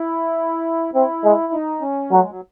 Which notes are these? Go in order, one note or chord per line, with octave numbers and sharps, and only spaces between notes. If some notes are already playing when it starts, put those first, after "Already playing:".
Already playing: E4
C4 E4
G#3
D#4
C#4
F#3 A3
G#3
F#3